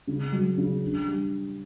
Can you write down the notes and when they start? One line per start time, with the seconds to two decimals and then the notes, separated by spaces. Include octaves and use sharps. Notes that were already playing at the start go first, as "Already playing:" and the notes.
0.07 C#3
0.32 F#3
0.58 C#3
0.81 D4
1.07 G3